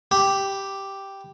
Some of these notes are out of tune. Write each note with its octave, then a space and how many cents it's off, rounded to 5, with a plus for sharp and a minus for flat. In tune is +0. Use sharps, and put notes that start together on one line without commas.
G4 +0 B5 +0